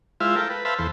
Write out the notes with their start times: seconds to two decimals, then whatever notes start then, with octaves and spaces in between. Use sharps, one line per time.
0.20 G#3 E4 F4 C5 E5 F5
0.36 A4 A#4 G5
0.50 B4
0.65 B4 C5 E5 F5 A5 B5
0.79 E2 A4 C5